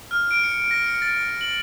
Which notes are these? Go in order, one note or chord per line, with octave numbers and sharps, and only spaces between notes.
F6
D7
C#7
A#6
C#7
A6
F#7